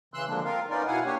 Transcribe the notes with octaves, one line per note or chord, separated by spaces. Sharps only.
C#3 E3 C6 E6 F#6
D3 F3 G#3 A#3 D4
C4 F4 A#4 F5
B3 C#4 D#4 F4 A#4 D5
B2 E4 F5 F#5 G#5
A#3 D4 G4 C#5